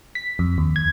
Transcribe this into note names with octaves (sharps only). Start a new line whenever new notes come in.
B6
F2
D#2
G#6